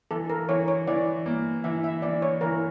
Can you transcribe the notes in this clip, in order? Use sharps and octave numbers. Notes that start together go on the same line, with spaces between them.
E3 A4
A#4
E3 C#5
C#5
E3 D5
A#3
E3 E5
E5
E3 D5
C#5
E3 A#4